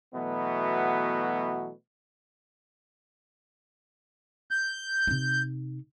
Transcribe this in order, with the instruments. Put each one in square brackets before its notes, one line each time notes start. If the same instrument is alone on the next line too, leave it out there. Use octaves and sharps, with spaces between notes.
[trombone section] B2 E3 F#3 A3 B3
[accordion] G6
[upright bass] C3 D#4